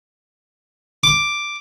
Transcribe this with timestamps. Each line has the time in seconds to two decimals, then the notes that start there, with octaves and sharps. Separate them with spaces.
1.04 D6